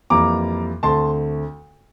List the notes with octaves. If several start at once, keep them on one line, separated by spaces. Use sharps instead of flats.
F2 E3 G3 A#3 A#5 D6
D2 D3 A3 C4 A5 C6